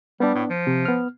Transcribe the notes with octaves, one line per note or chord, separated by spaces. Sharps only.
G3 B3 D4
A2
F3
C3
B3 F6